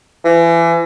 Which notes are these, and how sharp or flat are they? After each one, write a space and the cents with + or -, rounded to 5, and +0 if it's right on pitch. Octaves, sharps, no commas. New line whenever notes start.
E3 +30